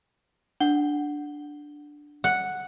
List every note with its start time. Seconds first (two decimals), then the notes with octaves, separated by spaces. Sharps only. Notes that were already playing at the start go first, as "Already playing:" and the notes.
0.60 D4 F#5 G7
2.24 F#5